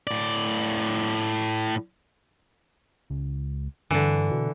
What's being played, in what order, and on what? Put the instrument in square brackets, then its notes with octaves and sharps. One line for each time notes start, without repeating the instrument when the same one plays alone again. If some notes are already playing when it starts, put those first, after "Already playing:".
[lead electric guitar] A2 D5
[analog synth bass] C#2
[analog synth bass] G2 [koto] D3 E3
[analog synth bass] B2